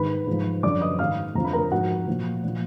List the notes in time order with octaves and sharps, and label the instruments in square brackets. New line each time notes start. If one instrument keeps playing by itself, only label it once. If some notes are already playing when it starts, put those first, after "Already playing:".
Already playing: [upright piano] G#2 D#3 B4 B5
G#2 F3
F#2 D3 F3 D5 D6
D#5 D#6
G#2 D#3 F5 F6
F2 D3 F3 A#5
B5
A#4 A#5
G#2 F3 F#4 F#5
A#2 F3
A#2 F3